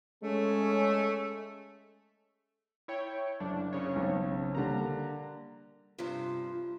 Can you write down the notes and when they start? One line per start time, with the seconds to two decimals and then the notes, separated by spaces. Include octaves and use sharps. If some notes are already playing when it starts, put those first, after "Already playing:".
0.23 G#3 A3 C#4
2.88 E4 C#5 G5
3.40 F#1 D4
3.73 C#3 C#5
3.96 B1 C4
4.55 D3 G3 A#3 A#5
5.98 G2 C3 F3